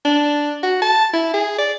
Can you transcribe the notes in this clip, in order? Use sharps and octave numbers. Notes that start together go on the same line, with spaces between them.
D4
F#4
A5
E4
G#4
D5